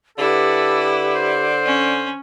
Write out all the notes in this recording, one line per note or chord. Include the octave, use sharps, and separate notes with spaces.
D3 E4 G4 A4 B4
C5
C#4